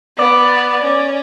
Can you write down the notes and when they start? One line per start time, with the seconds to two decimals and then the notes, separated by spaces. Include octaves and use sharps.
0.18 B3 D5
0.84 C#4